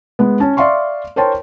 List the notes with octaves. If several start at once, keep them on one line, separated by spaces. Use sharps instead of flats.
G#3 B3
C#4 A5
D5 E5 F5 C6 C#6
A#4 C5 C#5 G5 A5 C6